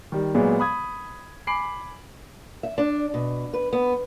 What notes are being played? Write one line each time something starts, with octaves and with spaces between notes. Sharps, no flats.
D#3 G3
A#2 F#3 G#3 B3
B5 D#6 G#6
G#5 B5 D6 C7 D7 F#7
E5
D4
B2
B4
B3